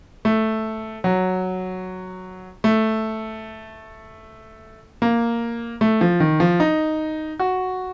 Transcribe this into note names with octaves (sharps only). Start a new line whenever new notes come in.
A3
F#3
A3
A#3
A3
F3
D#3
F3
D#4
F#4